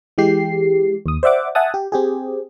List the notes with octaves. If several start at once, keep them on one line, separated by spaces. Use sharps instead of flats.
E3 G#3 G4 C7
D#2 D#6
C5 D5 E5 F#5 D6
E5 F#5 G#5 A5 D#6
G4
C4 G4 G#4